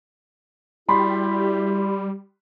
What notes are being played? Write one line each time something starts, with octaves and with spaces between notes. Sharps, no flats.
G3 E4 F#4 G4 B5 C6